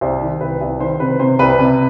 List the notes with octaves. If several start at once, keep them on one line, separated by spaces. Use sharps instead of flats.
C2 C5
D#3
C2 B4
C2
D#3 C5
C3 B4
C3 C5
C2 B4
C3